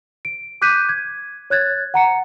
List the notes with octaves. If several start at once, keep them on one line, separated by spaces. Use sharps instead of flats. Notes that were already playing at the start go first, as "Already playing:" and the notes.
D7
D6 F#6 G6 B6 D#7
G#6
C#5 F#6 G#6 A6
F#5 A#5 C#7